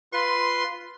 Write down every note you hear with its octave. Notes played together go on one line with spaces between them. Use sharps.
F4 B4 C6